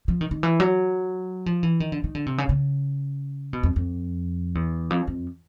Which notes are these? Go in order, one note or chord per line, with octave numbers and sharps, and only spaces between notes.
F3
D#3
D#3
E3
F#3
F3
E3
D#3
D3
D#3
D3
C3
C#3
C#3
B2
F2
F2
E2
F2
F2